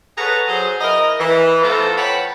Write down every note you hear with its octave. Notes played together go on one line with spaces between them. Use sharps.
G#4 A4 B4 C#5 F#5 A#5
F#3 G#4 C5
E4 A#4 D#5
E3
A3 B3 F4 A4 C5 A#5
B4 C#5 F#5 G5 A5 B5